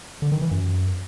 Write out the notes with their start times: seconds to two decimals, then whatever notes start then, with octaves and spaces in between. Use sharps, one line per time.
0.22 D3
0.32 D#3
0.41 E3
0.51 F#2